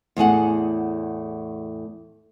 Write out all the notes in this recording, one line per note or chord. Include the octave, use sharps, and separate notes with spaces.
E2 A2 G#4 F#5